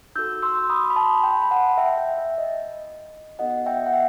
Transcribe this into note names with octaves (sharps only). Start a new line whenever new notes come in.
D#4 F#4 A4 E6 G6
C6 E6
C6
B5 D#6
B5
A5 C6
G5 B5
B5
F#5 A5
E5 G5
E5 G5
E5
D#5
B3 D#4 F#4 A4 D#5 F#5
E5 G5
F#5
E5 G5